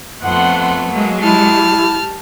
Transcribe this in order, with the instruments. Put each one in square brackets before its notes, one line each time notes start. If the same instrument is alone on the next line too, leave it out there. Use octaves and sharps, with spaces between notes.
[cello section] F2 [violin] A3 B3 [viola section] F#5 C6
[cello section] F#3 G#3 [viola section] A#3
[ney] E4 [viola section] G4 [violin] A5 F6